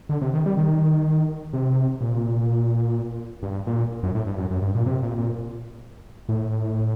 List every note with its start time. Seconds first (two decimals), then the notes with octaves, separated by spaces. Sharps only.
0.09 D3
0.21 C3
0.33 D#3
0.46 G3
0.57 D#3
1.53 C3
2.01 A#2
3.43 G2
3.67 A#2
4.03 F#2
4.15 A2
4.26 G2
4.38 F#2
4.51 F#2
4.62 G2
4.75 A#2
4.86 C3
5.03 A#2
5.17 A#2
6.29 A2